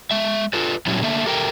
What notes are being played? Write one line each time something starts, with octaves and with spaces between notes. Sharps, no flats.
G#3 E5
F4 A4 B4
A#2 F#3 G3 C#4 E4
D3 A3 A#3 E5
G4 A4 A#4 E5 G5